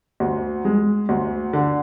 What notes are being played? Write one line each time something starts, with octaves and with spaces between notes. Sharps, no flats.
D2
G#3
D2
D3